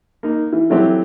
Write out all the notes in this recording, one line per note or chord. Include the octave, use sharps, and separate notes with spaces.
A#3 D#4
E3
E3 F#3 A3 C4 G4